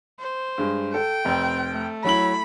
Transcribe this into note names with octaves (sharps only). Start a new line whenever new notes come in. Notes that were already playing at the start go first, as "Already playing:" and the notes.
C5
G2 G#3
A4 G5
F1 C4
A3
F#3 E4 B5 F#7